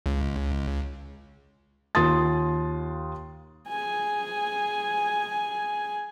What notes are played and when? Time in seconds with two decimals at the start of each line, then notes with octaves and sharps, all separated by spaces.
0.06 C#2
1.95 D#2 F4 C6 D#6 A6
3.69 G#4 G#5